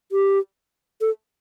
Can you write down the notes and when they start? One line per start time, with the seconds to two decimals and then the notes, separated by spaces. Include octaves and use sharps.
0.12 G4
1.01 A4